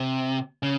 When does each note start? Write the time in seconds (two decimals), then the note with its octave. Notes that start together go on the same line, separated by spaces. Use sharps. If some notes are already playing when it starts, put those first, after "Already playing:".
Already playing: C3
0.63 C#3